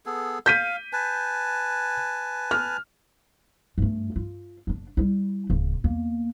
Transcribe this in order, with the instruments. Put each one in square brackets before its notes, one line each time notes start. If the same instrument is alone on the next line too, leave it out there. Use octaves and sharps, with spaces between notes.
[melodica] B3 G#4 A4
[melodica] F5 [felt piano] G6 B6 D#7
[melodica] B4 G#5 A5
[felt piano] F6
[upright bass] G2 A3
F4
F#1 D4
G3 E4
D1 C#3
E2 A#3